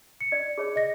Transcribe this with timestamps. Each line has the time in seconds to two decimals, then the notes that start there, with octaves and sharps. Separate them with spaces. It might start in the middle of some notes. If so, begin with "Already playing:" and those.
0.21 C#7
0.32 D5
0.58 G#4 C#5
0.76 D#5 A#6